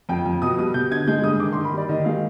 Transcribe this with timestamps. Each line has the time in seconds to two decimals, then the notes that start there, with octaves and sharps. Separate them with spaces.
0.09 F2 G5
0.26 F2
0.42 B2 D#6
0.59 G3 D#6
0.74 B2 G6
0.91 D3 G#6
1.08 G#3 G6
1.23 G2 D#6
1.39 D#3 D6
1.53 C6
1.57 D#3
1.64 B5
1.73 G3 D5
1.89 D#3 D#5
2.05 G#3 F5